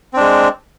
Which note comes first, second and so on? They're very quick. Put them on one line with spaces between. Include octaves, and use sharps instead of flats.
C4 D4 G#3